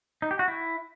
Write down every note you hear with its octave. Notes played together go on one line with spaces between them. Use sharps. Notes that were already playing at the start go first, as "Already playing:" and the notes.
D#4
G4
F#4
E4